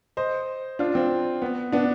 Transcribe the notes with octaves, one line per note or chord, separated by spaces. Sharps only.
C5 D#5
D4 F4
C4
B3
B3 D4